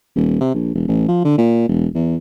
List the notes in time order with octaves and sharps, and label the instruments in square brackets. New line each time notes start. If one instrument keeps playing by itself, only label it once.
[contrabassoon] D#1
C3
A#1
E1
A1
F3
D3
A#2
E1
E2